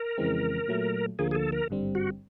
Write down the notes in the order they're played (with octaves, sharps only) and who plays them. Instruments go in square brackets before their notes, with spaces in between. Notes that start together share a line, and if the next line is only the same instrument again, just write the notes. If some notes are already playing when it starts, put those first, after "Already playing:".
Already playing: [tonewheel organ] A#4
[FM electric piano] F2 C#3 E3 G#3 C4
A#2 F#3 A3
[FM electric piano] D2 D3 F3 A#3 [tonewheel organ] G#4
[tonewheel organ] G#4
A4
A#4
[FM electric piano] G#1 G2 D3 G3 C4
[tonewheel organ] F#4